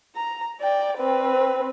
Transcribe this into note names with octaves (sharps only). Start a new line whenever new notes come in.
A#5
D5 G5
C4 B4